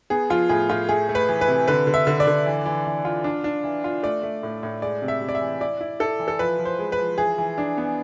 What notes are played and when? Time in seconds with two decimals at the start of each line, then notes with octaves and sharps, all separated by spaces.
0.10 B3 G#4
0.30 F3 F4
0.49 A2 G#4
0.69 A2 F4
0.89 A3 G#4
1.09 A3
1.15 B4
1.29 E3
1.41 B4
1.48 C3
1.68 D3 B4
1.87 D3
1.94 E5
2.07 D3
2.20 D5
2.27 D3
2.46 E3
2.66 E3
2.85 E3
3.05 F4
3.24 D4
3.44 D4
3.64 E3
3.84 F4
4.03 A3 D5
4.23 A3
4.43 A2
4.63 A2
4.82 G#3 D5
5.02 C3
5.08 E5
5.21 C3
5.29 D5
5.35 E5
5.41 E3
5.61 E4 D5
5.81 E4
6.00 E4 A4
6.19 E3
6.28 A4
6.39 F3 B4
6.59 F3
6.65 C5
6.79 G#3
6.92 B4
6.98 F3
7.18 E3 G#4
7.38 E3
7.58 D4
7.77 B3